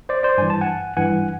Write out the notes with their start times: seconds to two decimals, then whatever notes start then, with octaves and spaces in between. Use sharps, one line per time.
0.09 C5 D5
0.23 C5 D5
0.38 G2 E3 G#5
0.50 A5
0.61 F#5 G#5
0.97 G2 E3 F#5 G#5